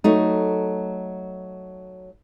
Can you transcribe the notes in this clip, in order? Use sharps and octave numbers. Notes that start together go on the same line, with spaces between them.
F#3 A3 D#4